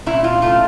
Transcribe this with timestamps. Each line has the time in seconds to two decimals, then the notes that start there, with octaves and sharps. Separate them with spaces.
0.06 A#2 E4
0.24 F4
0.42 A3 F4